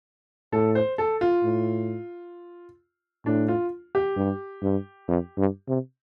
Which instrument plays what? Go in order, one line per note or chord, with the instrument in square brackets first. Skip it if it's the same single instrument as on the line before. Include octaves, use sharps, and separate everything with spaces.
[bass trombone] A2 [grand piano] A4
[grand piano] C5
A4
F4
[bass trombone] A2
[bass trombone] A2 [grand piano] D4
[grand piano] F4
G4
[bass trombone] G2
G2
F2
G2
C3